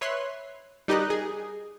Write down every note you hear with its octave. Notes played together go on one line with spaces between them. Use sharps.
B4 C#5 E5 C6 F#6
G3 D#4 G4 A#4 D#5 F#6
G#4 G#5